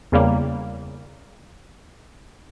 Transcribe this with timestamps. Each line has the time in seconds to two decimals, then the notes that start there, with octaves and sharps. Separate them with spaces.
0.12 E2 C#3 G3 A#3